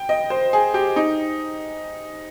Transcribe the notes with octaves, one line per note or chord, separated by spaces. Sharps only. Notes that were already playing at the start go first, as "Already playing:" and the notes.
Already playing: G5
D#5
C5
G#4
G4
D#4